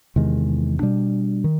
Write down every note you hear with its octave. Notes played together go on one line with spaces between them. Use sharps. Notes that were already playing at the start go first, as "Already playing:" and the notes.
E2 C3 D#3 G#3
B2 G3 B3 D4
D#3